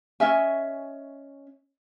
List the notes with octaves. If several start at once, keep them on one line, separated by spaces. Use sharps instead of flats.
C#4 D#5 E5 G#5